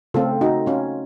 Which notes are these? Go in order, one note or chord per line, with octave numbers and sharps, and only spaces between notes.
C#3 A3 C4 F4 A4
D#4 F#4
C#4 F4